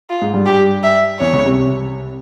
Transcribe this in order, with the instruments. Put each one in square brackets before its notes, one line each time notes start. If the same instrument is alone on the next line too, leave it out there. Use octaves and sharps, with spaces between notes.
[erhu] F4
[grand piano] G#2 G#3
G2 G3
[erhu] G4
E5
[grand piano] E2 E3 [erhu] C#5
[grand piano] C#2 C#3
C2 C3